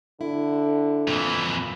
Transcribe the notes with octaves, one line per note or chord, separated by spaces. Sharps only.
D3 E4
F2 A#2 E3